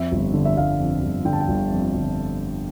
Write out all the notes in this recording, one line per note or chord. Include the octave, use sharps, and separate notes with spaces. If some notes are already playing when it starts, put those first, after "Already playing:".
Already playing: F2 E5
G1
D3
E5
G1 F5
F2
G1
D3 G5
A5
G5
G1
F2
G1